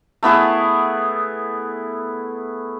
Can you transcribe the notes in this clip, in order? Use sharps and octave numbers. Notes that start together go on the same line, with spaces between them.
A3 B3 E4 G#4